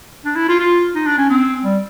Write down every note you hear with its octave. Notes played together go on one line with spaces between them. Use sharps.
D4
E4
F4
F4
D#4
D4
C#4
C4
G3